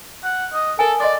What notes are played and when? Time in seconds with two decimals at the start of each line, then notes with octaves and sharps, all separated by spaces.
0.24 F#5
0.53 D#5
0.79 A4 A#4 G#5
1.00 D5 D#5 C6 D6